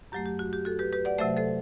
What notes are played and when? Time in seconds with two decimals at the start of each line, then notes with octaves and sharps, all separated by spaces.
0.12 F#2 F#3 A3 G4
0.26 G4
0.39 F#4
0.53 G4
0.65 F#4 A4
0.79 G4 B4
0.93 G4 B4
1.05 D5 F#5
1.18 C3 F#3 A3 C5 E5
1.37 A4 C5